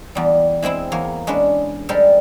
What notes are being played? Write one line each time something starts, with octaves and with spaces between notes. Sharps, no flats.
E2 G3
E3 G#3 C4 E4
E2 A#3 C#5
G#3 C#4 D4 B4
G3 G#3 A4 A#4 C5